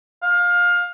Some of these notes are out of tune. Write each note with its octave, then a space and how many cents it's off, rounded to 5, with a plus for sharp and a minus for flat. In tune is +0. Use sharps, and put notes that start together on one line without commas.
F5 +20